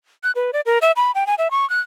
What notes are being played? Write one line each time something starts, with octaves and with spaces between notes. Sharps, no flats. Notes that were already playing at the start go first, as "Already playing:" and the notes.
F#6
B4
D5
A#4
E5
B5
G5
G#5
E5
C#6
F#6